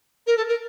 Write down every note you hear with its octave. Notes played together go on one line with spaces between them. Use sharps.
A#4
A4
A#4